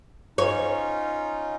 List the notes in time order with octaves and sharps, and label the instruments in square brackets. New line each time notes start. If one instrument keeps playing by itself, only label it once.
[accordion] C#4 D#4 F4 [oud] C#5